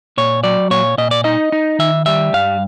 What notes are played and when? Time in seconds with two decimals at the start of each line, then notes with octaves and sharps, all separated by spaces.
0.17 A#2 C#5
0.44 F#3 D5
0.70 A#2 C#5
0.98 A#2 D#5
1.11 D5
1.24 D#4 D#5
1.52 D#4
1.79 D#3 E5
2.06 G3 E5
2.33 G2 F5